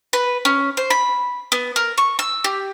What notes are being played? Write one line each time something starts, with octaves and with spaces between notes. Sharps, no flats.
B4
C#4
C5
B5
B3
A#4
C#6
E6
G4